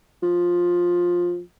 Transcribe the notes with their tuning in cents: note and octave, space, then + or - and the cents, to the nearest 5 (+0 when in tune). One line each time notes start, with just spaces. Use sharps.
F3 +10